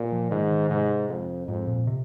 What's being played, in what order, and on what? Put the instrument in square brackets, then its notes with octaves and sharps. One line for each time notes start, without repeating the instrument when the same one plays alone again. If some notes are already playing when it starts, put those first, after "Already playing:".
Already playing: [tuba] A#2
[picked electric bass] F3
[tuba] G#2 [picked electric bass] D#3
[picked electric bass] D#3
[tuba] G#2 [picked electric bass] C3
[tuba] F2
[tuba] F2 [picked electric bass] G#2
[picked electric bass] A#2
C3